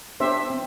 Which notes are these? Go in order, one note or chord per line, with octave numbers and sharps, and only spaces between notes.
B3 D4 G4 C5 E5
C4